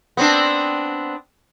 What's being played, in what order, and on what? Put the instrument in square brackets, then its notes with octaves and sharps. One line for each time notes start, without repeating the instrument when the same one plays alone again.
[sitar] B3 C4 D4